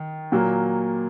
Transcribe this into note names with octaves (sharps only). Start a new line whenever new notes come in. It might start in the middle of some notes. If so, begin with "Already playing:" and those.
Already playing: D#3
A#2 F#3 A#3